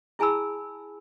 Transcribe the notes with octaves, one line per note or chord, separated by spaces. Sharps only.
E4 G#4 G#5 A5 B5 E6